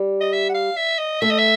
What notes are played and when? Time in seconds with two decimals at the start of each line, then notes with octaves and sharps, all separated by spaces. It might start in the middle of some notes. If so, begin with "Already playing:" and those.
Already playing: G3
0.21 D#5
0.33 E5
0.49 F#5
0.54 F5
0.77 E5
0.99 D#5
1.22 A3 E5
1.31 D#5
1.39 E5